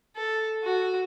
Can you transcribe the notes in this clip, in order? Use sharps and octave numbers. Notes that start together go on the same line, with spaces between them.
A4
F#4